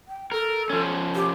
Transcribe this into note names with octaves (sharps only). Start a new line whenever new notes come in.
G5
A4 A#4
F3 C#4
G4